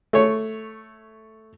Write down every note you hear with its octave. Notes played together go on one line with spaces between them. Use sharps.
A3 C#5